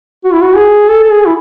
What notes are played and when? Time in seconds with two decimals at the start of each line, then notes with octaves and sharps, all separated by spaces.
0.24 F#4
0.32 E4
0.42 F#4
0.56 G#4
0.89 A4
1.03 A4
1.11 G#4
1.26 E4